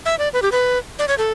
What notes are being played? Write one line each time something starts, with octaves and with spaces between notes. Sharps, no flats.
E5
D5
B4
G4
B4
D5
C#5
A4